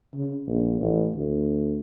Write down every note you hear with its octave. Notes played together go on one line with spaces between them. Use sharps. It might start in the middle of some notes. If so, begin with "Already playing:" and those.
C#3
A#1
A1
D2